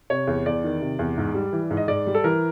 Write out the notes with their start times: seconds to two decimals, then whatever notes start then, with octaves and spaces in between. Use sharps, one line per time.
0.10 C3 C#5
0.27 E2
0.46 E2 D5
0.64 D#3
0.81 C3
0.99 E2
1.18 G#2
1.34 G3
1.53 E3
1.70 G#2
1.77 D#5
1.88 G#2 D5
2.07 G3
2.15 A4
2.24 E3 A#4